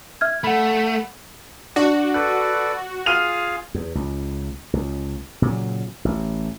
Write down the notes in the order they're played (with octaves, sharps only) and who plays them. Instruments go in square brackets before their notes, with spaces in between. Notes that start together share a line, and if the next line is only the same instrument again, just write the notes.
[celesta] E5 F6 G#6
[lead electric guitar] A3 [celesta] F#5 B5
[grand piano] D4 [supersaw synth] F#4
[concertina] A4 B4 D5 [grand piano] F#6
[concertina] F4 G#4 F5 [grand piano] F6 D#7 F7
[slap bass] E2
C#2
C#2
A#2 C#3 F#3
A1